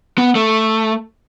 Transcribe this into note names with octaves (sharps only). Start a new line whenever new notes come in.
B3
A3